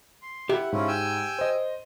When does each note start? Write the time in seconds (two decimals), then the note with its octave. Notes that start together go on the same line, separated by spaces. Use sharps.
0.22 C6
0.49 E4 G4 E5 F#5
0.72 G#2 C#4 E4 F4
0.88 G5 G#5 E6
1.39 C5 D#5